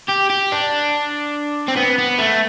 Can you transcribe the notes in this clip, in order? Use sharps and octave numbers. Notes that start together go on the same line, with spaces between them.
G4
G4
D4
C4
B3
B3
A3